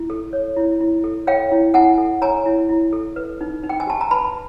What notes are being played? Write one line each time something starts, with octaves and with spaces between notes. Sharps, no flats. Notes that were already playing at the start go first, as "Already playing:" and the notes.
Already playing: E4
A4
C#5
E4
E4
A4
C#5 F5 G5
E4
E4 F#5 G#5
A4
C#5 G#5 A#5
E4
E4
A4
B4
D#4
D#4
G5
G#5
G4 A5
A#5
B4 A5 B5